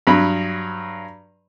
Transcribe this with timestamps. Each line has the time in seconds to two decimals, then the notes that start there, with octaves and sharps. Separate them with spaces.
0.07 G2 F#3 B5